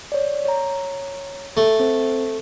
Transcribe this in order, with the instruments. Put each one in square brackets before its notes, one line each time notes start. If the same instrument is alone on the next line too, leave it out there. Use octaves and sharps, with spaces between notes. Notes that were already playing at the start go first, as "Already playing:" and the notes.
[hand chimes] C#5 D5
C#5 A#5
[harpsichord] A3
[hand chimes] C4 C5